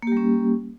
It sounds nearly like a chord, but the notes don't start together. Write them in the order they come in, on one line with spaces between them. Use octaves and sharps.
A#3 G4 G3 C#4